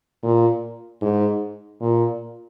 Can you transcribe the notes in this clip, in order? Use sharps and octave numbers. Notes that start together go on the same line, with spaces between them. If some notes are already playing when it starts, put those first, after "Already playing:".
A#2
G#2
A#2